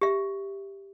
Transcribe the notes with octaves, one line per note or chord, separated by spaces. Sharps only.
G4 E5